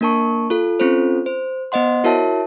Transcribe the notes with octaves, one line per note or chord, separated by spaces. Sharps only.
A#3 D4 A#4 A5 C#6
F4 A4
C4 C#4 F4 A4 C5
C5
B3 C5 D#5 F#5 C6
E4 F#4 A#4 C#5 E5 A5